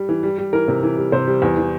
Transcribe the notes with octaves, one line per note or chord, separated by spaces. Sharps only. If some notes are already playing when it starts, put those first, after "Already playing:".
Already playing: G3
E3
G3
G3
E3 A#4
C3
E3
G3
C3 C5
G3
E2
E3